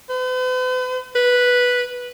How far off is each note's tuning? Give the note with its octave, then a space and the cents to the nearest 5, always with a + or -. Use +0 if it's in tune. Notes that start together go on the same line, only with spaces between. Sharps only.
B4 +45
B4 -5